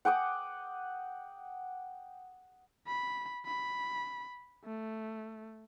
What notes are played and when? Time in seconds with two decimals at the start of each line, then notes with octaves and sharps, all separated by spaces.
0.05 F#5 G5 D6 D#6
2.87 B5
3.46 B5
4.65 A3